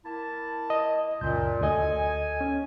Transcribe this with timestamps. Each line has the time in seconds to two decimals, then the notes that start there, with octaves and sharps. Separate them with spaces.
0.05 A#3 E4 A5
0.70 D#5
1.21 C#2 F#2 A#2 G6
1.61 D2 A4 D#5 G#5
2.41 C#4